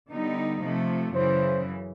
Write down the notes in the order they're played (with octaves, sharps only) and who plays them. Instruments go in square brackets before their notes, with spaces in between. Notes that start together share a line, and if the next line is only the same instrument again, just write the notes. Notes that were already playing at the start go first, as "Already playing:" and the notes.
[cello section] D3 G3 B3 D#4
C3 F3 A3
[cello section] F#2 C#3 E3 [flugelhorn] C5